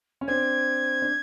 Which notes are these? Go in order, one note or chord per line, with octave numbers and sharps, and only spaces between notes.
C#4
C4 D4 G#6
D4